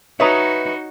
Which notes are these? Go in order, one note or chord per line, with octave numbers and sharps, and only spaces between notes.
D#4 F#4 B4 C#5 D#5 E5 A#5